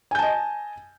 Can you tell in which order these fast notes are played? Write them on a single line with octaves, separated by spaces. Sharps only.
G#5 G6 A5 D#5